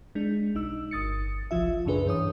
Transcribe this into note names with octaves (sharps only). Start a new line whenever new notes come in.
G#3 D4
B1 D#4 E6
G1 D#6 A6 C#7
G1 C2 F3 F4 E5
F#2 A#2 C#3 D4 G#4 B4
G2 E3 C#5 D#6